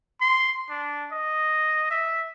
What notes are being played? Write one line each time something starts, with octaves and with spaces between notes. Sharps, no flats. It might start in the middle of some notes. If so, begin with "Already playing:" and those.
C6
D4
D#5
E5